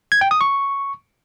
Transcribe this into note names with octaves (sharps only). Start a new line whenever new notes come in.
G#6
G5
D#6
C#6